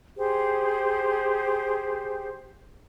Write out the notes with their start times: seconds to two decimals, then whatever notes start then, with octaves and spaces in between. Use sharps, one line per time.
0.16 G4 G#4 C5